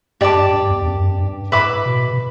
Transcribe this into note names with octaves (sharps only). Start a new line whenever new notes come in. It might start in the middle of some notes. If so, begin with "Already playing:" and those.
G2 G4 D5 A5 D6
G2
G2
E2
F#2
G2
A2 B4 E5 B5 D6
B2
B2